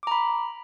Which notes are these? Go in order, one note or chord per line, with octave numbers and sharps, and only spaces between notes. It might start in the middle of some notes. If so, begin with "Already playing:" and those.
A#5 B5 D6